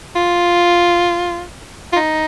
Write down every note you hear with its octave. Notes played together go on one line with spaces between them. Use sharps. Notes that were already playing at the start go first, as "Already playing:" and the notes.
F4
F4
D#4